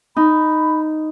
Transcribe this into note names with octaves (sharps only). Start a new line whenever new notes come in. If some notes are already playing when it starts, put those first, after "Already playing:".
D#4 B5